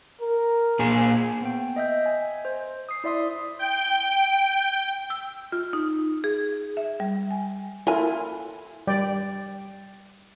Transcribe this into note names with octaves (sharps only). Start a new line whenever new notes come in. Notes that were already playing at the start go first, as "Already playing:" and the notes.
A#4
A#2 G#4
B3 G5
D#5 E5 G6
G#5
C5
D#6 C7
E4 D5 E5 C6 D#6
G5
E6
F4
D#4
G#4
E5
G3
G#5
E4 F4 A4 A#4 G#5
G3 D5 G5